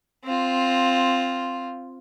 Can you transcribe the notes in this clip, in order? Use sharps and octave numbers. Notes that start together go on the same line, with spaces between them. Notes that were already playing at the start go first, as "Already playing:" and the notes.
C4 F4